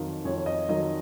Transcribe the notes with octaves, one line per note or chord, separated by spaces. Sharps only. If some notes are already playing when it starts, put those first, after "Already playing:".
Already playing: F2 D#3 F#3 F5
F2 C#5
D#5
D#3 F#3 D#5